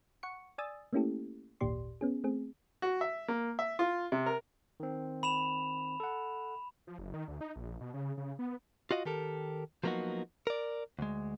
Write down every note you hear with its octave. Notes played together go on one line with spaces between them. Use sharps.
F#5 C#6 C#7
D5 G#5 D#6 E6 A6
A3 A#3 C#4 E4 G4 A4
G#1 D#2 A#2 G4 D5 C6
B3 C#4 G#4
A3 C4 G#4
F#4
E5
A#3
E5
F4
C3
A#4
D#3 C4
B5 E7 F7
A4 F#5
F3
F#1
D#3
D2
D#4
A#1
B2
C#3
C#3
B3
F4 F#4 D#5 F5
D#3 G4 A4 A#4
F3 F#3 A#3 B3 D#4 F#4
A#4 D5
D2 G#3